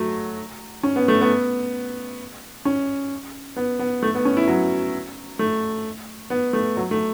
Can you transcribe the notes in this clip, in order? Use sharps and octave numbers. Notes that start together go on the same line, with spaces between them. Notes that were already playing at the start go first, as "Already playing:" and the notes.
Already playing: F#3 A3
C#4
B3
A3
B3
C#4
B3
B3
A3
B3
C#4
E4
F#3
A3
B3
A3
F#3
A3